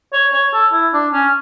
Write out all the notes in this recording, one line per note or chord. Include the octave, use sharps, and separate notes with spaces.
C#5
C#5
A4
E4
D4
C#4